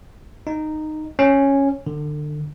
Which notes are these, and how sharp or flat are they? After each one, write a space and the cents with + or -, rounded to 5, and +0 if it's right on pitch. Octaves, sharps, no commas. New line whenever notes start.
D#4 -10
C#4 -5
D3 +30